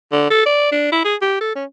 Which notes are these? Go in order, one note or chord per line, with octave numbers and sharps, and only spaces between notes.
D3
A4
D5
D4
E4
G#4
G4
A4
C#4